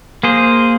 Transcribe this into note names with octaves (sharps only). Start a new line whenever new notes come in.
A#3 G#4 C5